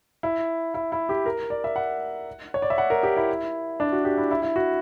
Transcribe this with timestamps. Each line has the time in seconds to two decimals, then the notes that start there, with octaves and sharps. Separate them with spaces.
0.23 E4
0.74 E4
0.92 E4
1.09 G4
1.26 A#4
1.50 D5
1.64 E5
1.76 F#5
2.54 C#5
2.62 D5
2.70 E5
2.78 F#5
2.90 A#4
3.03 G4
3.17 E4
3.80 D4
3.92 F#4
4.05 G4
4.17 E4
4.31 E4
4.43 E4
4.56 F#4